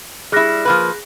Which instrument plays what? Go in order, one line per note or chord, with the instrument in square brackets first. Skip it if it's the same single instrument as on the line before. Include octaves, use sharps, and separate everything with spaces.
[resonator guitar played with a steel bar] G3 E4 [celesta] G#4 F#6 A#6
[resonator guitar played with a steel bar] F3 A#3 B4